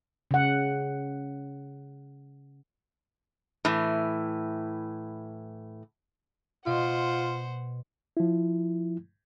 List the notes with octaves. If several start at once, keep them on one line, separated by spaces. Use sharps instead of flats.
C#3 F#5
A2 E3
B2 F4 C5 F#5
F3 E4